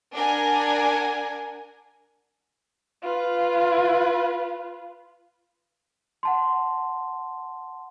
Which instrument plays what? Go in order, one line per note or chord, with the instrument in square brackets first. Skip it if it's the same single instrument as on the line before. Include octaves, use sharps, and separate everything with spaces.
[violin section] D4 A#4 F#5 G#5
[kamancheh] F4 B4
[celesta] F#5 A5 C6